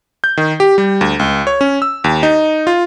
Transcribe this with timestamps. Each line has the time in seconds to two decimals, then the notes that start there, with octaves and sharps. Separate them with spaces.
0.24 G6
0.37 D#3
0.60 G4
0.78 G3
1.01 D2
1.19 C#2
1.47 C#5
1.61 C#4
1.82 E6
2.04 D#2
2.23 D#4
2.67 F4